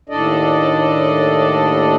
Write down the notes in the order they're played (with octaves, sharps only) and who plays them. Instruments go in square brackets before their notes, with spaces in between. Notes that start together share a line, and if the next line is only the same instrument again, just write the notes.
[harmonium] D#2 A2 D4 A4 D5 D#5